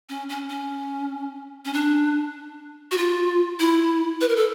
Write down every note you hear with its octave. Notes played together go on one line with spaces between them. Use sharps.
C#4
C#4
C#4
C#4
D4
F#4
F4
E4
B4
A#4
A4